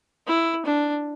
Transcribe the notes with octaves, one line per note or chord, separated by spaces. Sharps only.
E4
D4